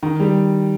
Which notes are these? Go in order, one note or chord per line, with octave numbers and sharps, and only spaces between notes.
D#3
G3